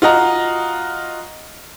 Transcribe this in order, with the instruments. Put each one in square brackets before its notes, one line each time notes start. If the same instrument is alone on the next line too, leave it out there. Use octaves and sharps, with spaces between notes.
[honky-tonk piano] F4 F#4 D#5 A#5